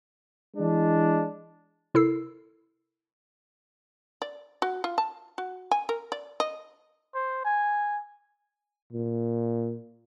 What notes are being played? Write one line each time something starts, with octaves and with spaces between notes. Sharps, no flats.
E3 G#3 D4
C3 E4 A4 A#4 E6 C7
D5
F#4
F4
A5
F#4
G#5
A#4
D5
D#5
C5
G#5
A#2